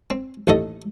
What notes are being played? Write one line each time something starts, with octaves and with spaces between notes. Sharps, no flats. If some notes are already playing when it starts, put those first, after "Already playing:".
C4
A1 D#2 A3 A4 D#5